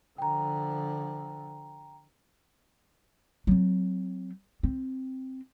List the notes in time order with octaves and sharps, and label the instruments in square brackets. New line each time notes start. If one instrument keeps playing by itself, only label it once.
[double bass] D3 F3 [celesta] G5 A#5
[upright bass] F#3 C4
C4